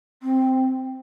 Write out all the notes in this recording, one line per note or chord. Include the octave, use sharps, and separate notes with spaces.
C4